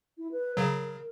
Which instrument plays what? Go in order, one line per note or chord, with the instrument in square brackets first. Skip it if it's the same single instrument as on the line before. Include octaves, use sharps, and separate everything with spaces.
[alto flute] E4
B4
[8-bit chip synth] C#3 F#3 [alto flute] A#4